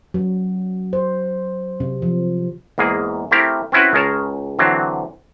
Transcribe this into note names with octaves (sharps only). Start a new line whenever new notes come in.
F#3
C5
C3
F3
E2 G#2 A#3 G#4
A3 C4 E4 G4 A#4
C4 C#4 E4 F#4 B4
C#2 G#4 A#4 C#5 A5
D3 E3 F#3 C4